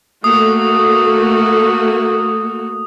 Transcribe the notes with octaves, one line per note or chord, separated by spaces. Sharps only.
A3 A#3 F#4 D#6